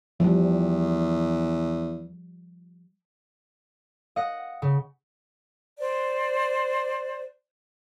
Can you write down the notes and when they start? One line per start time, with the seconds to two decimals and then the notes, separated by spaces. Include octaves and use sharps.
0.20 E2 F3 G3
4.16 D#5 F5 F#5
4.62 C#3
5.79 C5 D5